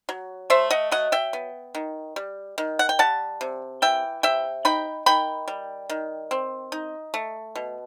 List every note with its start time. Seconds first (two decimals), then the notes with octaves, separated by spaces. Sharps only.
0.09 F#3
0.50 A3 C5 E5
0.71 D#5 F#5
0.92 F#3 D#5 F#5
1.12 E5 G5
1.33 B3
1.75 D#3
2.16 G3
2.58 D#3
2.79 F#5
2.89 G5
2.99 G3 F#5 A5
3.41 C3
3.82 E3 E5 G5
4.23 C3 E5 G5
4.65 D#4 G5 B5
5.06 D#3 G5 B5
5.48 G3
5.90 D#3
6.31 C4
6.72 D#4
7.14 A3
7.55 B2